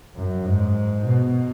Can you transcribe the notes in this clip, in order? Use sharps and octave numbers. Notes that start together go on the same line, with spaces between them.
F#2
G#2
B2